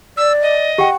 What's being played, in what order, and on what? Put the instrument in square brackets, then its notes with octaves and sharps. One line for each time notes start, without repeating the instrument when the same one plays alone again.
[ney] D5 [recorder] E6
[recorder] D#5
[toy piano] G4 G5 [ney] F#5